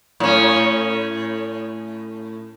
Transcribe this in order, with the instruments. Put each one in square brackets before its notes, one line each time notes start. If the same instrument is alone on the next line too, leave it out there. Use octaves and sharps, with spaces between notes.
[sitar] A2 C#4